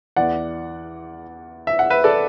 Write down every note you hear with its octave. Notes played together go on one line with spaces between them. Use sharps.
E2 E3 D5 F#5
E5
F#5
B4 E5
A4 D5